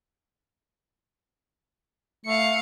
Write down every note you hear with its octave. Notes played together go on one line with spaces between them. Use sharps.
A3 F5 C#7